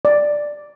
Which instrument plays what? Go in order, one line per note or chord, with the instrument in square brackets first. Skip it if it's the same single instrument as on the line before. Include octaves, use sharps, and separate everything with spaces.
[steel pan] D5